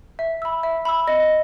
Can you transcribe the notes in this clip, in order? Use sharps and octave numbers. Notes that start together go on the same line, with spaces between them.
E5
B5 E6
E5
B5 E6
D#5